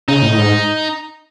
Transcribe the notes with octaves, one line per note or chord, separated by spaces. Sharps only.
C#3 D#4
A2
G#2